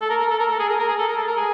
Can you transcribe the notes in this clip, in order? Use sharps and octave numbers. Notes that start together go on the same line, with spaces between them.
A4
A#4
A#4
A4
A#4
A4
G#4
A#4
A#4
G#4
A4
A#4
A4
A#4
G#4